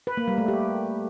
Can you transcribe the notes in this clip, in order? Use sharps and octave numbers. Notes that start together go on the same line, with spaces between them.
B4
A#3
G3
A3
G4